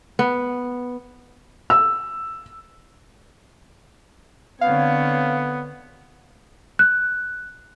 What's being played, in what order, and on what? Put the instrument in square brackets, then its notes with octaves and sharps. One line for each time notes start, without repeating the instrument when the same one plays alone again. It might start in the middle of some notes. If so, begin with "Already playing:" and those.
[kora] B3
[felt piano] E6
[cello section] D3 C4 C#5 [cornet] B3 [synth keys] F5
[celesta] F#6